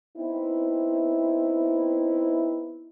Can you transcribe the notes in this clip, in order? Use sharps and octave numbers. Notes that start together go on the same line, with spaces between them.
B3 C4 D#4 E4